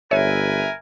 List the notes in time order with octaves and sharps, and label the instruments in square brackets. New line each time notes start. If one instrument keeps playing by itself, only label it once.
[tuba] G1 [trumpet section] A#4 B4 G#5 [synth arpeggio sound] C#5 [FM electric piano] E5